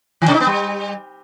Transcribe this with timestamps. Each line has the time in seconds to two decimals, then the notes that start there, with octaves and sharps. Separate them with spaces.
0.22 D#3
0.28 C3
0.34 D#4
0.40 B3
0.47 G3